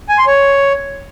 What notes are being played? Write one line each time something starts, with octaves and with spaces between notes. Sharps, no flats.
G#5
C6
C#5